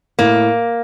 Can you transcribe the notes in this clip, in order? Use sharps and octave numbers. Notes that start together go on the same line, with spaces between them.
A2 A#3